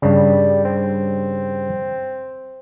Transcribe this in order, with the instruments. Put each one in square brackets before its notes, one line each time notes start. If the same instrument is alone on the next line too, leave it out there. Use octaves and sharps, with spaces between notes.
[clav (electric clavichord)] G2 C#3 [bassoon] G3
[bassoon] C4